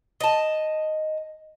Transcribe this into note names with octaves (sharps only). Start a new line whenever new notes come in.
D#5 A5